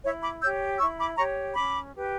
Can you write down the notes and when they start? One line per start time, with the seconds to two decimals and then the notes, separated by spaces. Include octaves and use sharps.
0.03 E4 C#5 E5
0.22 B5 D6
0.41 G4 C#5 E6 G6
0.79 E4 C#6 E6
0.99 B5 D6
1.17 G4 C#5 A#5 C#6
1.55 C#4 B5 D6
1.93 G4 B4